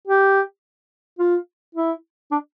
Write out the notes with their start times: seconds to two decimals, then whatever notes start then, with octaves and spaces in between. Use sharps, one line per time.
0.07 G4
1.19 F4
1.75 E4
2.31 D4